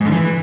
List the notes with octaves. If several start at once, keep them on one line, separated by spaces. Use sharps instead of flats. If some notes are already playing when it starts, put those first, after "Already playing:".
G#2
D3
E3